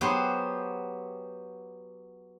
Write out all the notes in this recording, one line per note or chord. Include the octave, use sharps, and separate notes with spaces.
F#3 B3 G4 G#4 C5